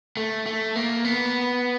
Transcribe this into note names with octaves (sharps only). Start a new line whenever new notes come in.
A3
A3
A#3
B3